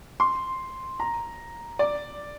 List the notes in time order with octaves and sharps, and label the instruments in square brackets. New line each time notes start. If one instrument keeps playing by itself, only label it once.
[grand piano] C6
A#5
D5